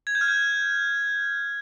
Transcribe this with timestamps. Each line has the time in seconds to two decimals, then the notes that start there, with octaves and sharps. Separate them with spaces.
0.07 G#6
0.15 G6
0.21 F6
0.28 G6